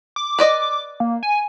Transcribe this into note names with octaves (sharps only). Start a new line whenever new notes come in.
D6
B4 D5 D#5
A#3
G#5